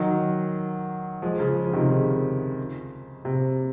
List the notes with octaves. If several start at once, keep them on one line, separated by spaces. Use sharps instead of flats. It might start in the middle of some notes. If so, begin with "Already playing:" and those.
Already playing: D#3 F#3
F3 G#3
C#3 F3
F3
C3 D#3
C#3
C3